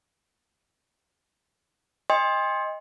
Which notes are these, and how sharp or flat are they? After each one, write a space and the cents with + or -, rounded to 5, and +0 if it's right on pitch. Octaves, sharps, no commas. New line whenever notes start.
D#5 +5 G5 +45 C6 +15